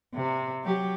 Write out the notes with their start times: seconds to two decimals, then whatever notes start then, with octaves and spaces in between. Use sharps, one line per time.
0.15 C3
0.64 F#3 G4